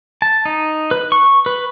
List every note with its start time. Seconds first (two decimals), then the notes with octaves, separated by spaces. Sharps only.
0.22 A5
0.45 D#4
0.91 B4
1.12 C#6
1.46 B4